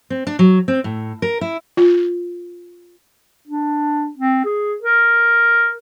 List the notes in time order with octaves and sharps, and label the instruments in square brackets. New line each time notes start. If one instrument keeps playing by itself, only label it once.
[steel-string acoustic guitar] C4
D4
F#3
C4
A2
A#4
E4
[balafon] F4
[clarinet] D4
C4
G#4
A#4